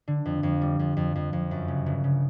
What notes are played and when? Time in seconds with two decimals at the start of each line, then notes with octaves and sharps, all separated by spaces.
0.08 D3
0.25 F2
0.43 F2
0.62 G3
0.79 F2
0.97 F2
1.15 F2
1.33 F2
1.51 F#2
1.68 C#3
1.86 G1
2.04 C#3